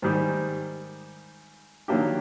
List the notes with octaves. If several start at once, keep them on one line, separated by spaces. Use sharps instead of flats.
G#2 D#3 G3
D#3 F#3 A#3 D4 G4